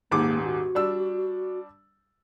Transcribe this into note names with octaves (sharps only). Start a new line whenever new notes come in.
D#1 G#2 A#3 D6
F#4
G3 D4 E6